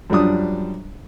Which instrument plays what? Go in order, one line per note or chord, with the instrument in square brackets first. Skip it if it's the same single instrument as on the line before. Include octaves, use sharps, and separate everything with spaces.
[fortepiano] F#2 F3 G3 D4 D#6